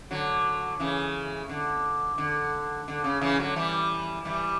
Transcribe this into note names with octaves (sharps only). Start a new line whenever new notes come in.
D3 F#3
C#3 E3
D3
D3
D3
C#3
C#3 E3
D3 F#3
E3 G3
E3 G3